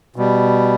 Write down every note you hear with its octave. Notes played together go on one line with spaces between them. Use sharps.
B2 G3